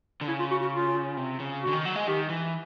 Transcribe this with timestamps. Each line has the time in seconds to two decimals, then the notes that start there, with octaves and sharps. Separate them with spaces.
0.21 D3
0.28 C#3 E4
0.39 F4
0.51 F#4
0.61 F#4
0.73 F4
1.17 C3
1.40 C#3
1.62 D3 F#4
1.73 D#3
1.85 F#3
1.96 G#3
2.07 D#3 G4
2.29 E3